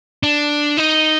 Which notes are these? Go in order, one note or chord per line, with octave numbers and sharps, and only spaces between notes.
D4
D#4